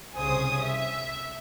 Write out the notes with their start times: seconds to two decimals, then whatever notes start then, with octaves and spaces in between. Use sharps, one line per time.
0.15 C2 C#3 C5 G#5 D#6
0.62 E5